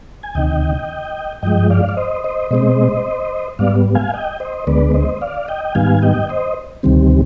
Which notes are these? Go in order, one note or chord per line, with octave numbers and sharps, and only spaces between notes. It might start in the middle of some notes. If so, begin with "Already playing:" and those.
G#5
D2 C3 D#3 D#5 G5
G2 F3 G#3 D#5 G5
D5 F5
D5
C5 D#5
C5 D#5
B2 G#3 C4 C5 D#5
G#2 G3 B3 D5 F5
F5 G#5
D#5 G5
C5 D#5
D2 D3 G#3 B3 B4 D5
C5 D#5
D5 F5
D#5 G5
G5
G#2 D#3 G3 B3 F5 G#5
D#5 G5
C5 D#5
D2 C3 D#3 G3 C4